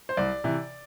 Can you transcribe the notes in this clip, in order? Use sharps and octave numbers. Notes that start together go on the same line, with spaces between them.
C5
C2 D5
C3 E3